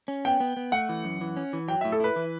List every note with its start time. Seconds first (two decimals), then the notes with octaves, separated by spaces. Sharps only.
0.08 C#4
0.25 B3 G5
0.40 B3
0.57 B3
0.72 A3 F#5
0.89 E3
1.04 F#2
1.21 E3
1.37 C#4
1.53 E3
1.68 F#3 G5
1.81 A2 E5
1.92 A4
2.00 E4 B4
2.16 E3